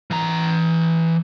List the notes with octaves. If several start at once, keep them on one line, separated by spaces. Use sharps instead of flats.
E3 A#5